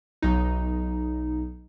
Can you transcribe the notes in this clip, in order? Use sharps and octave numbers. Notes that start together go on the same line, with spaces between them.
B1 D#4